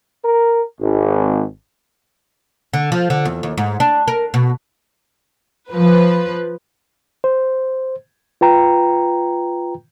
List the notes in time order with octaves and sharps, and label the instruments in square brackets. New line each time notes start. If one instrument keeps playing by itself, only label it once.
[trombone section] A#4
G#1
[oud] D3
F3
D3
E2
D#2
G#2
D4
A#4
B2
[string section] F3 B4
[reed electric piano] C5
F4 B4 G5 A#5